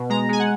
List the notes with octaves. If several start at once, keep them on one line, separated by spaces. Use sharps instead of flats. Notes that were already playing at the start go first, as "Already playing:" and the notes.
Already playing: B2
G#3 A#5
G#3 G#5
F#5